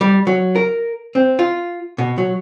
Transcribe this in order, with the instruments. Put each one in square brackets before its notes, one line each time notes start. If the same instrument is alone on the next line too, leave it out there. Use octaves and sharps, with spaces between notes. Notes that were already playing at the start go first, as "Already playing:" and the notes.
[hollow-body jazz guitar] G3
F#3
A#4
C4
F4
B2
F#3